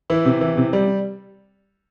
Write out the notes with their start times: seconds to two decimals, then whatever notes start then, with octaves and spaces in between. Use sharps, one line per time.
0.10 E3 E4
0.25 C3
0.41 E3
0.57 C3
0.73 G3